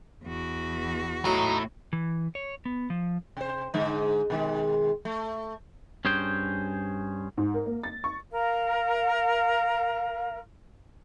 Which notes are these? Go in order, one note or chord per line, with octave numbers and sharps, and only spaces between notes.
E2 F#4
A2 F#3 D#4
E3
C#5
B3
F3
C3 C5
G#2 D3 G#3
B2 D#3 G#3
A3
G2 C#4 G#4 C5 G5
G#2
A#4
A#3
A6
C#6
A#4 F5